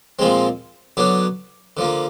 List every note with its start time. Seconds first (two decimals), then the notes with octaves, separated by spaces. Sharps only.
0.19 A#2 F3 G#3 C4
0.97 D3 F#3 B3 D4
1.77 D3 F3 A#3